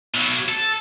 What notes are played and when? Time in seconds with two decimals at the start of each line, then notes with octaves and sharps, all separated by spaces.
0.14 B2 F#3
0.48 A4